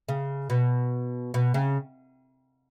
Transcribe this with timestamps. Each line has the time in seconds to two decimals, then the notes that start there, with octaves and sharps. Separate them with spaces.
0.09 C#3
0.50 B2
1.34 B2
1.54 C#3